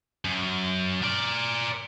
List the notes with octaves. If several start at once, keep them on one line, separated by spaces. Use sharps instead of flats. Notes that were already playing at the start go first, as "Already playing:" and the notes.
F#2
A#4 D5